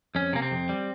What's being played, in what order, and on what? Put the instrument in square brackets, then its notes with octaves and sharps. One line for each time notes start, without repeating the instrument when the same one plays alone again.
[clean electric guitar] F2 C#4
C3 A#3
C4
F2
G3